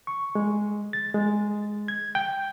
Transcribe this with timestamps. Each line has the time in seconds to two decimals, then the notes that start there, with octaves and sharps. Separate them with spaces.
0.07 C#6
0.35 G#3
0.93 A6
1.15 G#3
1.88 G#6
2.15 G5